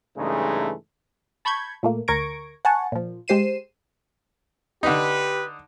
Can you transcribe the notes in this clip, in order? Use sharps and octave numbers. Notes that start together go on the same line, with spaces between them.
G2 C#3 E3 G#3 A3 D#4
A5 B5 C#6 G6 G#6
A#2 A3 A#3
D2 A#4 C#6 G#6 A#6 D7
F#5 G#5 A5 C#6
A#2 F3
G#3 G4 C5 C7 D#7 E7
D3 D#4 G4 B4